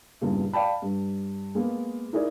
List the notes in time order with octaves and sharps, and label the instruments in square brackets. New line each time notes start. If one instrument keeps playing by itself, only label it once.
[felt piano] E2 G2 A#2 C#3
D5 F5 G5 A5 B5
G2
G#3 A#3 B3
D#4 E4 G#4 A#4 D5